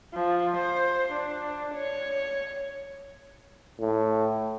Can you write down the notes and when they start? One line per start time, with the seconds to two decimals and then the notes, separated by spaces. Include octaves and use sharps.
0.14 F3
0.57 C5
1.13 D4
1.75 C#5
3.81 A2